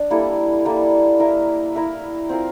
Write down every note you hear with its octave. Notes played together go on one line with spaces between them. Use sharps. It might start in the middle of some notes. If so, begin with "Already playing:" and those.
Already playing: D4
G3 A#3 E4 A4
G3 A#3 E4 A4
E4 A#4 E5
E4 A#4 E5
C4 F4 A#4